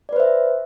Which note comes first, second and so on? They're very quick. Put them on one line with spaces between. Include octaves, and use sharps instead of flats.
D5 B4 C5 E5